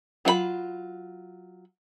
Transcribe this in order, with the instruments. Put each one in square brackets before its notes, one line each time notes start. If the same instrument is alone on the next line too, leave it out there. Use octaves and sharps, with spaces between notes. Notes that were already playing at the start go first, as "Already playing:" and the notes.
[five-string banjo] F#3 F4 A#4 B5